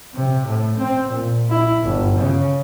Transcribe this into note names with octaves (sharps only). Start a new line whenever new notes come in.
C3
A2
C4
A#2
E4
G1
C#3